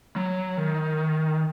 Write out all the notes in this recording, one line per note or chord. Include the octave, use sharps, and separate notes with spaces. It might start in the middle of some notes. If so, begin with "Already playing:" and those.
F#3
D#3